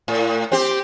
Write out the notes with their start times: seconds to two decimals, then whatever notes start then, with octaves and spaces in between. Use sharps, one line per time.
0.08 A2
0.52 C4 G4